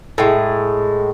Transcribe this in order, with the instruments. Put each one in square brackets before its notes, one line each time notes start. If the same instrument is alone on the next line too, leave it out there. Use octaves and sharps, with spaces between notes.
[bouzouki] A2 G#3